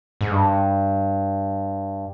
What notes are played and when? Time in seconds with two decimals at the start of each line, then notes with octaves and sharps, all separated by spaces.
0.21 G#2
0.31 G2